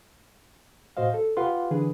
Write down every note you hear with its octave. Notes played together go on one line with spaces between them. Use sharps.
A2 F#4 C5 D#5 F5
A4
F4 G4 B4 F5 F#5 C6
D3 E3 D4 G#4 B4